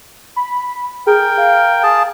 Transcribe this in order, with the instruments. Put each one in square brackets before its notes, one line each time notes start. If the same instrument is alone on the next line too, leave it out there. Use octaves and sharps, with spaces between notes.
[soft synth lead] B5
[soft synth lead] G#4 [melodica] A#4 G5
[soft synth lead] F5
[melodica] G#4 A5